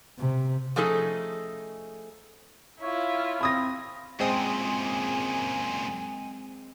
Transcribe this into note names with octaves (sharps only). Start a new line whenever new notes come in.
C3
F3 A3 C#4 D#4 G#4 A4
E4 F4 C#5
C4 B5 D#6 A#6
F#2 A#2 G#3 C4 G#5 D#6